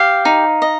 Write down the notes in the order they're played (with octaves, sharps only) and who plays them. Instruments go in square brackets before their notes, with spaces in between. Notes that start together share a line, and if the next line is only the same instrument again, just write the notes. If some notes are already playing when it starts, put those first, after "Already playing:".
Already playing: [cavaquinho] G4 F5
D#4
D#5